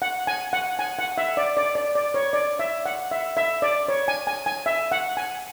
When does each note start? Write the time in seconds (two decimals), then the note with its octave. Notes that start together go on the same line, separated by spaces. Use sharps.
0.02 F#5
0.27 G#5
0.53 F#5
0.79 G#5
0.99 F#5
1.18 E5
1.37 D5
1.57 D5
1.75 D5
1.95 D5
2.14 C#5
2.33 D5
2.59 E5
2.86 F#5
3.11 E5
3.37 E5
3.62 D5
3.88 C#5
4.08 G#5
4.27 G#5
4.46 G#5
4.66 E5
4.92 F#5
5.17 G#5